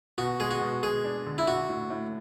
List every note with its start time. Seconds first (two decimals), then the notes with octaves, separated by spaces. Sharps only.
0.18 B2 F#4
0.40 G#3 G#4
0.51 F#4
0.61 B2
0.83 G#3 G#4
1.04 D4
1.26 D3
1.38 E4
1.47 D4 F#4
1.69 A2
1.90 A2